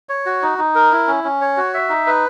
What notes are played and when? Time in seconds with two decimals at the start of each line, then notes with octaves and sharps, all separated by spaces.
0.09 C#5
0.26 F#4
0.42 D#4
0.58 D#4
0.75 A#4
0.92 E4
1.07 C#4
1.24 C#4
1.41 C#5
1.57 F#4
1.74 E5
1.89 D#4
2.07 B4